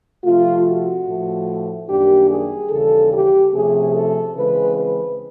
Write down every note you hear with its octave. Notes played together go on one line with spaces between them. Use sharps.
C3 F3 A3 F4
F#4
A2 F3 A3
F#2 D#3 G3 A#3 D4 G4
G#4
D#2 C#3 E3 G3 A4
G4
C3 F3 A3 C#4 G#4
A4
C#3 E3 G#3 C4 B4
B4